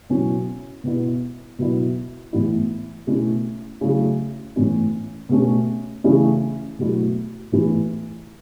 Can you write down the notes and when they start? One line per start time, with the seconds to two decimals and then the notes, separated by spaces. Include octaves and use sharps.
0.09 B2 F#3 C#4 E4
0.84 B2 B3 E4
1.59 B2 F#3 B3 E4
2.33 A2 E3 B3 E4
3.07 B2 A3 C#4 E4
3.81 C#3 F#3 A3 E4
4.56 A2 E3 C#4 E4
5.29 B2 A3 C#4
6.04 C#3 E3 A3 C#4 E4
6.79 B2 F#3 A3 E4
7.52 A2 E3 A3